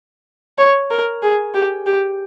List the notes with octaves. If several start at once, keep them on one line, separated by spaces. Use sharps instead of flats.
C#5
A#4
G#4
G4
G4